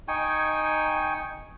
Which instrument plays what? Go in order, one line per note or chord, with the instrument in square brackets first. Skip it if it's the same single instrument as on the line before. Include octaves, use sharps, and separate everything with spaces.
[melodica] D#4 G5 G#5 C#6